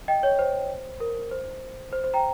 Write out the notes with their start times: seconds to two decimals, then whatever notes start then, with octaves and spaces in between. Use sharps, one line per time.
0.08 D#5 G5
0.23 C#5
0.39 C5
1.00 A#4
1.31 C5
1.93 C5
2.04 C5
2.14 G5 A#5